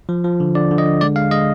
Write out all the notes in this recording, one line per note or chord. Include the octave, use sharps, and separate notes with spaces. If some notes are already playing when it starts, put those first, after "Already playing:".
F3
F3
D3
D3 D5
D3
D#5
D3
G#3 D5
G#3 F5
G#3 D#5